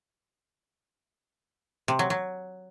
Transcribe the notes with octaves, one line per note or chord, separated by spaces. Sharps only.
C3
F#3
F#3